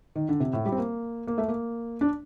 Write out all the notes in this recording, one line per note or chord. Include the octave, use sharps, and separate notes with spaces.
D#3
D3
C3
A2
G3
C4
A#3
A#3
A3
A#3
D4